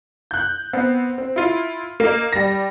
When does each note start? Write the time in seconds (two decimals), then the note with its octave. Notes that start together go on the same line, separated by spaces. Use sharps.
0.31 F#6 G6
0.73 B3 C4
1.18 C4
1.36 E4 F4
2.00 A#3 A#4 D#5
2.33 G3 A#6